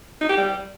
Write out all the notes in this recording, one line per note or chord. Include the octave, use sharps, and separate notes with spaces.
D#4
G4
G3